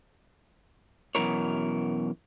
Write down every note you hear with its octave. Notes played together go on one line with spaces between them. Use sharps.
F#2 B2 D#3 E3 A#4 C#5